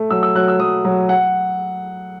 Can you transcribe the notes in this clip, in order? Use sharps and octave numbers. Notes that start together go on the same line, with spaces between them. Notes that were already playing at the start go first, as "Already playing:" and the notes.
Already playing: A3
F#3 E6
E6
F#3 F#6
E6
F#3 D#6
F#3
F#5